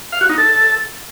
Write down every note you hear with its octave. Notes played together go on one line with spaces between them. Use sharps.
F5
F#4
D#4
A4